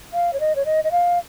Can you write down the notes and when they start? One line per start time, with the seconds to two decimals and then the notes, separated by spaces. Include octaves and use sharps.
0.13 F5
0.33 C#5
0.40 D#5
0.56 C#5
0.65 D#5
0.84 D#5
0.92 F5